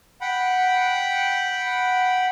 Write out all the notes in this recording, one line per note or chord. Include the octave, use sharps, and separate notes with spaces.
F#5 G5 B5